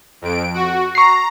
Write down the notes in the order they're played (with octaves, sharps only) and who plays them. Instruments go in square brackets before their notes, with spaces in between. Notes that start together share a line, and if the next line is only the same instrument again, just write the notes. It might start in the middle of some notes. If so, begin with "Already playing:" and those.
[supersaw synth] F2 D7
F#4
[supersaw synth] A#5 [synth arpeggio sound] C#6 C7